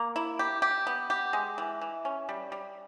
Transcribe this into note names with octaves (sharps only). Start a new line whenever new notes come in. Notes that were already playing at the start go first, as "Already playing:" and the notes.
Already playing: A#3
E4
G4
G4
B3
G4
G#3
E3
E3
C#4
G3
G3